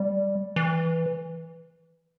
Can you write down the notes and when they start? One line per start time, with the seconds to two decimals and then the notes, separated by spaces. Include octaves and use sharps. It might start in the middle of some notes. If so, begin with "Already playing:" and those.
Already playing: G3
0.56 E3